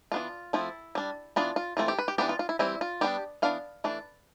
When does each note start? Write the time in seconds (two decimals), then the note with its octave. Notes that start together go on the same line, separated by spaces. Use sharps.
0.12 E3 B3 D4 F4
0.53 F3 A3 C4 E4
0.95 G3 D4
1.36 E3 B3 D4 F4
1.56 F4
1.77 E3 A3 C4 F4
1.88 G4
1.99 B4
2.08 G4
2.18 E3 B3 D4 G4
2.29 F4
2.39 F4
2.49 E4
2.59 E3 G3 C4 E4
2.81 F4
3.01 G3 B3 D4 G4
3.42 E3 B3 D4 F5
3.84 E3 A3 D4